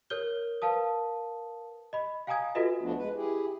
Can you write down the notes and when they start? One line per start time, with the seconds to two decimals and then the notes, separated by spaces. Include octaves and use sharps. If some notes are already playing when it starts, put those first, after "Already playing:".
0.10 A#4 C#5 F6 G6 G7
0.62 A#4 B4 F5 A5 D#6
1.93 D#5 B5
2.27 F5 G5 G#5 A#5 D#6 G#6
2.55 F4 F#4 A4 B4 D#5 E5
2.82 D2 F3 A3 B3 D4
2.98 G#3 B4
3.15 E4 G4 G#4